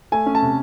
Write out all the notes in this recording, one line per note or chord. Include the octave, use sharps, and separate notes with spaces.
A3 G#5
C#4
A5
C3